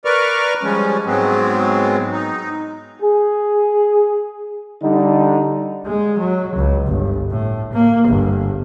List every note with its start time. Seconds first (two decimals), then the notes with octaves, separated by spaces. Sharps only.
0.05 A#4 B4 D5 C#6 F6
0.63 F3 G3 G#3 C#4
1.06 G#2 F#3 G#3 B3 C4
2.12 D#4
3.02 G#4
4.83 D3 G3 D#4
5.86 G#3
6.19 F#3
6.56 C#2
6.87 G1
7.31 A2
7.73 A#3
8.08 G1